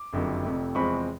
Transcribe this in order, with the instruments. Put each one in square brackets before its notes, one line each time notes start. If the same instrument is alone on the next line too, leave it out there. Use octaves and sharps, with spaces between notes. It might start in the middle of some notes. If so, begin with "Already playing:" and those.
Already playing: [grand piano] D6
F#1 F2 D3 F#3 A#3
F1 F2 C3
E2 C3 F3 G#3 C4 B5 C#6